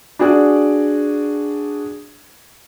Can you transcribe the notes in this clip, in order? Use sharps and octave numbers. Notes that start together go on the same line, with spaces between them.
D4 F#4 G#4 D5